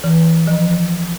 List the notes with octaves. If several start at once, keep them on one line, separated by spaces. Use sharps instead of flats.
E3
F3